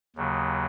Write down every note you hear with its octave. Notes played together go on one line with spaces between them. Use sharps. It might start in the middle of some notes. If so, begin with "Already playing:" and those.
D#2 C#3 F#3